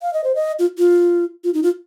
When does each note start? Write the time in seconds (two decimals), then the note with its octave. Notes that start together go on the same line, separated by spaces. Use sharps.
0.02 F5
0.14 D#5
0.24 C5
0.35 D#5
0.59 F4
0.78 F4
1.44 F4
1.54 D#4
1.63 F4